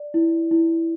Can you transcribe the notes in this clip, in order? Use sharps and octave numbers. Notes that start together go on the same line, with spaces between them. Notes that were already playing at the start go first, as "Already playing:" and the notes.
Already playing: D5
E4
E4